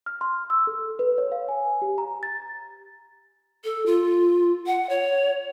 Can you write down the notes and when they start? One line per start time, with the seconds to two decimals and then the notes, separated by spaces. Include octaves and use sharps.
0.06 F6
0.21 C6
0.50 E6
0.67 A4
0.99 B4
1.18 C#5
1.32 F5
1.48 G#5
1.82 G4
1.98 A#5
2.23 A6
3.64 A4
3.86 F4
4.66 F#5
4.90 C#5